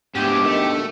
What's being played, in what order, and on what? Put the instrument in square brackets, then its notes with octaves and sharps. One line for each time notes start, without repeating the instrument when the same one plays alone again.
[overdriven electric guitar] D2 B2 [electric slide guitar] G#2 F3 E4 [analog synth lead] G4
[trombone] D#3 [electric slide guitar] A3